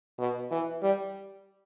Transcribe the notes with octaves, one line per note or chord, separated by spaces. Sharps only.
B2
E3
G3